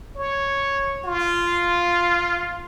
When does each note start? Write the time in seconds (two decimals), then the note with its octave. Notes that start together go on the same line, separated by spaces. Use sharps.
0.16 C#5
1.05 F4